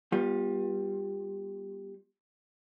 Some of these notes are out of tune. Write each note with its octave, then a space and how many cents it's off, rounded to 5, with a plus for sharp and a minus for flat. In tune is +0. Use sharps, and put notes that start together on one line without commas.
G3 +10 B3 -25 F4 +25